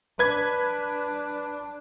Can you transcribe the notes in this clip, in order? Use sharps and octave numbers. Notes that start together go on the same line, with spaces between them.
D4 B4 G#6